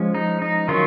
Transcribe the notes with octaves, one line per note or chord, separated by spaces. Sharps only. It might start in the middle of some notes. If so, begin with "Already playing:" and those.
Already playing: F3 G#3 C#4
D#4
D#4
D#3 F#3 C#4 F4